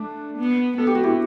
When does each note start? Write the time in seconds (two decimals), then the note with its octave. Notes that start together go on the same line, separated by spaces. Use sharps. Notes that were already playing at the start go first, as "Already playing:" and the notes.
Already playing: A3 D4
0.38 B3
0.78 B3 A4
0.87 G4
0.95 F#4
1.03 E4 G4